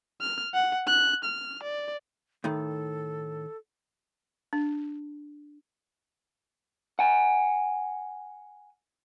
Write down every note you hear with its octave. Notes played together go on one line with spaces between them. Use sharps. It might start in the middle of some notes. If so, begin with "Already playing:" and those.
F6
F#5
F#6
F6
D5
A2 D#3 A4
D4
F#5 G#5